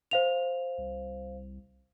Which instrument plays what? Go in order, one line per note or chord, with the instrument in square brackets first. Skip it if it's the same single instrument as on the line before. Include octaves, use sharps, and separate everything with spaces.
[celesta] C5 F5 F7
[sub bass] C2